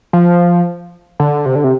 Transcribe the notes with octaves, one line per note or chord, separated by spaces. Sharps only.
F3
D3
C3
D3
C3